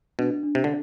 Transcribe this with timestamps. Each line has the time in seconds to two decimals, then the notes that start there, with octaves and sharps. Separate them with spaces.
0.19 B2 D4
0.43 D4
0.55 C3
0.64 D3